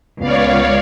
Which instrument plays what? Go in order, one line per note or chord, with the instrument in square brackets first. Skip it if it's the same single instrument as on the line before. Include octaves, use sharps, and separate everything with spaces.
[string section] C#2 [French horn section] A#2 B3 [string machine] C#5 D5 F5